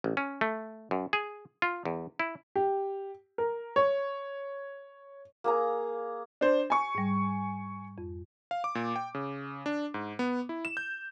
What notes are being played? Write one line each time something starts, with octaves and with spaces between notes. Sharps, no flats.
A1
C#4
A3
F#2
G#4
F4
E2
E4
G4
A#4
C#5
A#3 G#4 A#5
D4 C5
G#5 C#6
G#2 G3
F2
F5
D6
A#2
G5
C#3
D4
G#2
B3
E4
E7
G6